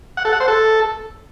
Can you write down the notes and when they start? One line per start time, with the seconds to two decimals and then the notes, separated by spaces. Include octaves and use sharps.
0.17 F#5
0.25 A4
0.33 F#5
0.40 C5
0.48 A4